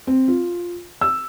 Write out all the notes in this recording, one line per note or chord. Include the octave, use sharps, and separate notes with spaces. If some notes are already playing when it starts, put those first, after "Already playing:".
C4
F4
E6